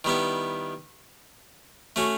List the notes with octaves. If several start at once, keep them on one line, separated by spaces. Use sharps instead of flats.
D#3 G3 B3 E4
A3 C#4 F#4